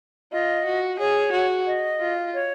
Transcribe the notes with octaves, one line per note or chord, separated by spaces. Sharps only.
F4 D#5
F#4
G#4 C#5
F#4
D#5
F4
C#5